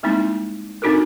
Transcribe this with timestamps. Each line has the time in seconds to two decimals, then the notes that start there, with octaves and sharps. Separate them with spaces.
0.03 G3 G#3 A#3 C4 D#4 E4
0.82 C4 D4 D#4 F#4 A4 A#4